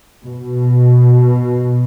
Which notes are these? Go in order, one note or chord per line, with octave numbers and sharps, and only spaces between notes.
B2